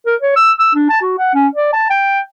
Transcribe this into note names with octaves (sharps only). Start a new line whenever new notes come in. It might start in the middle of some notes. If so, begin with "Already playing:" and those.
A#4
C#5
E6
E6
D4
A5
F#4
F#5
C#4
D5
A5
G5